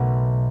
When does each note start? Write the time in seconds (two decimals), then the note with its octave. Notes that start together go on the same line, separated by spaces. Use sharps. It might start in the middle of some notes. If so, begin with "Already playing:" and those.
Already playing: B1 B2 A3